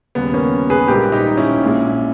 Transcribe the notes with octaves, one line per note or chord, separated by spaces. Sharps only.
D#2 C#3 G3 B3
A#3 C#4
G#4 B4
A#1 G#2 G3 G4 A#4
D#4 G4
C#4 E4
A#1 A#2 G#3